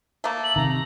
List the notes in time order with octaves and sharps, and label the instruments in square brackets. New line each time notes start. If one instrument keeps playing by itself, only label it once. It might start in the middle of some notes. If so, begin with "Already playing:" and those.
[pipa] A3 A#3
[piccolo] F#7
[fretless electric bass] C3 D#3 [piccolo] A#5